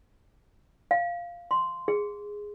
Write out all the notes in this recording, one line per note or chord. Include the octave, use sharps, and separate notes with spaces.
F5
C6
G#4